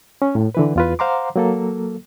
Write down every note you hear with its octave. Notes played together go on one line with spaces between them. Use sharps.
C#4
A2
D3 E3 B4
E2 F4 B4
C5 F5 F#5 A#5 C6 D6
F#3 A#3 A4